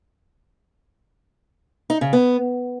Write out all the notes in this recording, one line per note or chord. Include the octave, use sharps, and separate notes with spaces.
D#4
C#3
B3